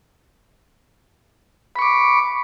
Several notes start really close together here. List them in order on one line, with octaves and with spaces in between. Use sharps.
B5 C#6 D6